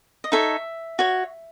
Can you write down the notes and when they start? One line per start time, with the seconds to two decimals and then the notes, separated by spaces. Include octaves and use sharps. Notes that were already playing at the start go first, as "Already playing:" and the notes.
0.24 D#5
0.32 D#4 A4 C#5 E5
0.99 F#4 C#5